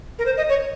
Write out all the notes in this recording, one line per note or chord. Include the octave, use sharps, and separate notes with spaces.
A#4
C5
D#5
C#5